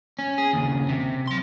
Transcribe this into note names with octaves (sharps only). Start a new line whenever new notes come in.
C#4
G#4
D#2 C#3
C3
F#3 C6